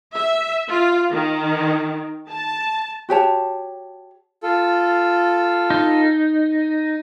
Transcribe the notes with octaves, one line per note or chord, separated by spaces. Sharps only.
E5
F4
D#3
A5
F#4 G4 C#5 A5
F4 A4
D#4